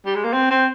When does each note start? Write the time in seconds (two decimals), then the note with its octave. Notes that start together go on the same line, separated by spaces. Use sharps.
0.06 G3
0.15 G#3
0.24 A#3
0.33 C4
0.51 C4